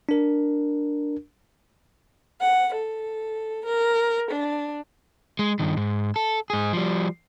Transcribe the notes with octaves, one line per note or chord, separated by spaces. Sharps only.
D4 A#4
F#5
A4
A#4
D4
G#3
G2 D#3
G#2
A4
G#2 G#4
F3 G3